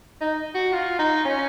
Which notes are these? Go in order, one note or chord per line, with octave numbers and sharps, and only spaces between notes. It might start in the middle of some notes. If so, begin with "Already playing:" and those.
D#4
F#4
F4
D#4
C#4